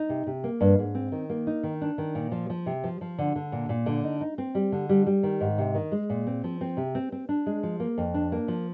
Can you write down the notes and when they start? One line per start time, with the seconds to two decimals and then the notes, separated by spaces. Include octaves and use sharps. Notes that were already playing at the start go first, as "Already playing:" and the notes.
Already playing: D#4
0.09 C3
0.27 C3
0.44 A#3
0.61 G2
0.79 G#2
0.95 C4
1.12 D#3
1.30 A#3
1.47 D#4
1.63 D#3
1.81 D4
1.98 D#3
2.15 A#2
2.32 F3
2.50 F3
2.66 C3
2.84 F3
3.01 F3
3.18 D3
3.35 D3
3.52 A#2
3.69 A#2
3.86 D3
4.04 D#4
4.21 D#4
4.38 C4
4.55 G3
4.72 D3
4.89 G3
5.06 G3
5.23 D#3
5.41 G#2
5.58 C3
5.74 D#3
5.92 G#3
6.10 A#2
6.27 C4
6.44 F3
6.61 C4
6.77 C3
6.95 C4
7.12 C4
7.29 D4
7.46 G#3
7.63 F3
7.80 A#3
7.98 F2
8.14 D4
8.32 A#3
8.48 F3